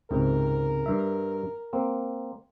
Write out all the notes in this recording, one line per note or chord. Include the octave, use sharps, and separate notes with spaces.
C#2 G#2 C3 A#4
G2 E5
A#3 C4